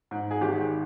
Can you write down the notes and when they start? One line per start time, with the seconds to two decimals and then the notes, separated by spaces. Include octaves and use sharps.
0.11 G#2
0.31 G#4
0.41 G#1 G4